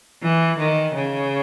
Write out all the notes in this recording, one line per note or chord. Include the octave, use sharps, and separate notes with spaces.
E3
D#3
C#3